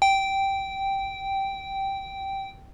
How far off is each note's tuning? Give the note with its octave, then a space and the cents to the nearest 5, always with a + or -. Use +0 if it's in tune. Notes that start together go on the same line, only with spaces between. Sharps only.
G5 -10